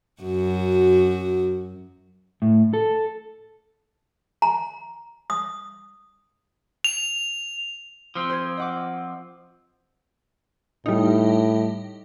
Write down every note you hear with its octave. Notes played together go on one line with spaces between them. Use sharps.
F#2 F#4
A2
A4
A#5
D#6
F7
F3 C4
C5 G#6
D#5 F#5 D6
A2 G3 D#4